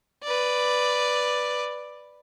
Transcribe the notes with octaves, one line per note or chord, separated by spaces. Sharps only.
B4 D5